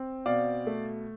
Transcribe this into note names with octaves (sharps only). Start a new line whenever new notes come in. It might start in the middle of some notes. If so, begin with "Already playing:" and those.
Already playing: C4
B2 D5 F5
A3